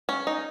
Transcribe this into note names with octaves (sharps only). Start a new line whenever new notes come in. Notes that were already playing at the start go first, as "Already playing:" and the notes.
C#4
D#4